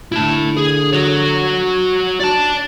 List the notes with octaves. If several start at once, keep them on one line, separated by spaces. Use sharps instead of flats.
D3 E4 A5
G#4
F#4 C#5
D5 A5